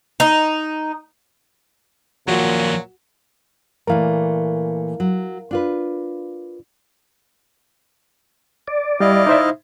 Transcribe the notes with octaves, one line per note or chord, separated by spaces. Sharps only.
D#4
D#2 A#2 F3 F#3 F#4
A#2 E3 A3 A#4 F5
F#3
D4 F4 B4
D5
G3 E4 D#5 F5
D#4 C5 E5